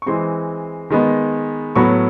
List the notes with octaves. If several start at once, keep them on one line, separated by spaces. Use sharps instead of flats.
C#6
E3 G#3 C4 C6
D#3 G#3 B3
A2 F#3 B3 C#6